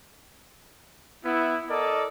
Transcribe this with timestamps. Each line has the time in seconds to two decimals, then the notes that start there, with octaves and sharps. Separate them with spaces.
1.25 B3 E4
1.70 A4 A#4 D5 D#5